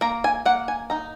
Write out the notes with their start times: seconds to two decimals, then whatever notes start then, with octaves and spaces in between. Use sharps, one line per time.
0.01 A#3 A#5
0.24 G#5
0.45 A#3 F#5
0.68 G#5
0.90 D#4 A#5